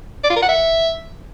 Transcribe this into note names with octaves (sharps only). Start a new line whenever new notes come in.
D5
F4
A#4
F#5
E5